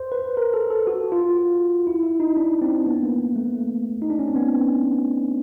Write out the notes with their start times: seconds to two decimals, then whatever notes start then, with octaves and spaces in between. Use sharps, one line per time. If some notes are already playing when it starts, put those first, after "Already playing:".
Already playing: C5
0.12 B4
0.37 A#4
0.54 A4
0.70 A4
0.87 F#4
1.12 F4
1.87 E4
2.03 E4
2.20 D#4
2.37 D4
2.62 C4
2.87 B3
3.03 A#3
3.36 A3
4.02 D#4
4.10 D4
4.19 C#4
4.28 C4
4.36 B3